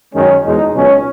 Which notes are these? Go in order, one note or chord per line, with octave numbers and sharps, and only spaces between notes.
F#2 D#3 G#3 C#4
E2 B2 G#3 D#4
C#2 B2 F#3 C#4